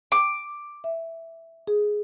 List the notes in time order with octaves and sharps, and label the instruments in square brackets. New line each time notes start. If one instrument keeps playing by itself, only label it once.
[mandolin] D6
[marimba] E5
G#4